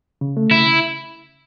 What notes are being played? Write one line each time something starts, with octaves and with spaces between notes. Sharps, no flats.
C#3
A3
C#3 E4
C#3